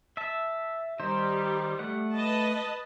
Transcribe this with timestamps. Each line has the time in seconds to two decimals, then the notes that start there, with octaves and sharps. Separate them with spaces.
0.17 E5 A5
0.99 D#3 G3 D#4 C5
1.79 A3 F#5
2.13 B4 D#5 A5